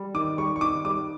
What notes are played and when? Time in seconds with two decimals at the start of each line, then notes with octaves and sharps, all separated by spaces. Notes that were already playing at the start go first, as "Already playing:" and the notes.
Already playing: G3
0.14 D#3 D6
0.38 G3 C#6
0.56 C#6
0.61 D#3 D6
0.85 G3 D6